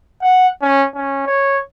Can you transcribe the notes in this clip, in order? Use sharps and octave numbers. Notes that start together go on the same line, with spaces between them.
F#5
C#4
C#4
C#5